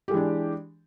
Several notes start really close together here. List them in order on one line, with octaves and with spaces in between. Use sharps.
G4 G#3 E3 D4